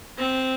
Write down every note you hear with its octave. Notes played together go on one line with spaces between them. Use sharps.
C4